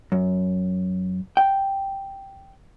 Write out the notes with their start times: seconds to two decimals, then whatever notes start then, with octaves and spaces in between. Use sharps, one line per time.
0.12 F#2
1.37 G5